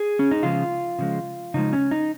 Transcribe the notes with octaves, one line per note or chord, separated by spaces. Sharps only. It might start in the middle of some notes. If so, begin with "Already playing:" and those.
Already playing: G#4
C#4
D#4
C#3 F3 G#3 F4
C#3 F3 G#3
C#3 F3 G#3 D#4
C#4
D#4